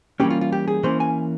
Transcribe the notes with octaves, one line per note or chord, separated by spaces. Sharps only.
E3 G3 A#3 C#4 G4
F4
F4
G4
G#4
E3 A#3 C#4 C5
G#5